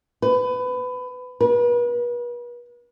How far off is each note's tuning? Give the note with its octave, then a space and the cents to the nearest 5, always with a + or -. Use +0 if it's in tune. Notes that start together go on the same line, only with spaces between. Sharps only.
B4 +25
B4 -40